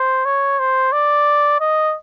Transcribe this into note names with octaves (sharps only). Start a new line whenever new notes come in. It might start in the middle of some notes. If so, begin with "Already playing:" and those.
Already playing: C5
C#5
C5
D5
D#5